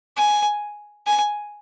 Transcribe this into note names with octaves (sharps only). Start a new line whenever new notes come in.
G#5
G#5